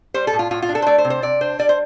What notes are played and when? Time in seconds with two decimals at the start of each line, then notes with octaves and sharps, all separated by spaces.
0.14 G3 C5
0.27 A4
0.33 A2
0.39 F4
0.51 A2 F4
0.62 F4
0.69 D4
0.75 A4
0.82 C5
0.87 A3 D5
0.98 C5
1.05 C3
1.10 C5
1.22 C3 D5
1.41 D4 C5
1.59 G3 D5
1.69 C5